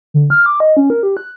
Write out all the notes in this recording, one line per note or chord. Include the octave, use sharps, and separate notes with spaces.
D3
F6
D6
D#5
C#4
A#4
G4
F#6